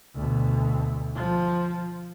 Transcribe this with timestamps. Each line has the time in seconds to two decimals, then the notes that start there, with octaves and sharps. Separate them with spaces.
0.15 D2 B2
1.15 F3